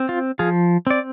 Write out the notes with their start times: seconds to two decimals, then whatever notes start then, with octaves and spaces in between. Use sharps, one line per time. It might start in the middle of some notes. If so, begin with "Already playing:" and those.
Already playing: C4
0.09 F4
0.39 F3 F4 G#4
0.87 C4 D5